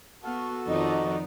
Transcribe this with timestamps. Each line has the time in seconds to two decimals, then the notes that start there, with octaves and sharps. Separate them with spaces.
0.23 B3 F#4 A4 F5
0.67 F2 D#3 F3 B3 D#4 D5 D#5